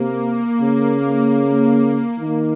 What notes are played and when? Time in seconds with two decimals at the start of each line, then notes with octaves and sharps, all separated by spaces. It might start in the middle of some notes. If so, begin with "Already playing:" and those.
Already playing: C3 A#3
0.61 C#3
2.20 D#3